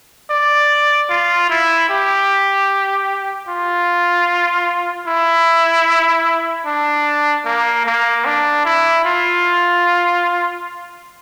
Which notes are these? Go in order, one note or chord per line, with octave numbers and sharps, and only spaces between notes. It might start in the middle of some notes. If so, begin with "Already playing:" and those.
D5
F4
E4
G4
F4
E4
D4
A#3
A#3
D4
E4
F4